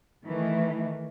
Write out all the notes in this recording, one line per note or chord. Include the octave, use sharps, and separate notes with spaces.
D#3 E3 A3